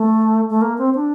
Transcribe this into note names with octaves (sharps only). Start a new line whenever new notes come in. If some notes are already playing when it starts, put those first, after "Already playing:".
Already playing: A3
A3
A#3
C4
D4